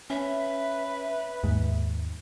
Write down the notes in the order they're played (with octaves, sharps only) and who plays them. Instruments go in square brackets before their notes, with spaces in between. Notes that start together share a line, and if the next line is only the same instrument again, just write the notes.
[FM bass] C#4 [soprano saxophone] B4 [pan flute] E5
[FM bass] D#2 [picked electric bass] G#2